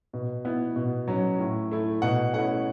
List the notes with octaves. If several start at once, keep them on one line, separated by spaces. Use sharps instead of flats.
B2
B3 E4
B2
F#3 C#4
A2
A3 E4
B2 F#5
A3 C#4 E4 F#5